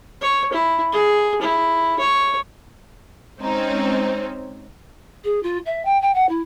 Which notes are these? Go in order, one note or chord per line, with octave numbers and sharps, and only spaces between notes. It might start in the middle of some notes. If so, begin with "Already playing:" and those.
C#5
E4
G#4
E4
C#5
G#3 C4 C#4 D#4 C5
G#4
F4
E5
G5
G5
F#5
E4